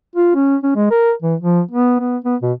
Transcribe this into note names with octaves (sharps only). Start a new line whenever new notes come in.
F4
C#4
C#4
G#3
A#4
E3
F3
B3
B3
B3
B2